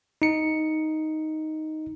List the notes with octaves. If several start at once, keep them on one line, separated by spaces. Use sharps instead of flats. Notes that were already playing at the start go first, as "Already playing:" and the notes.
D#4 C#7